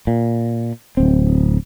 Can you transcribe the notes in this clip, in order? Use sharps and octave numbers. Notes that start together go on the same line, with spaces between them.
A#2
D1 C4